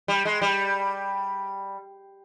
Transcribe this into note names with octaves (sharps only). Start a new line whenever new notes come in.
G3
G#3
G3